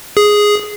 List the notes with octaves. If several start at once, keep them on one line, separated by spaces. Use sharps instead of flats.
G#4